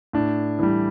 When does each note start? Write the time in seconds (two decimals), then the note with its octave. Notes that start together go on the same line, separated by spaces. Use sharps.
0.13 A2 D4
0.59 E3 G3